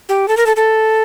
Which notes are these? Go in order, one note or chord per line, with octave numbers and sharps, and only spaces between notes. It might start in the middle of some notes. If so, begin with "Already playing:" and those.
G4
A4
A#4
A4
A4